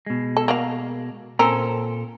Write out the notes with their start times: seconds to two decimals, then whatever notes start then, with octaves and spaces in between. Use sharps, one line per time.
0.06 B2 G#3
0.37 A4
0.48 A#3 F#4 F5
1.39 A#2 C4 C#4 A4 A#4 C6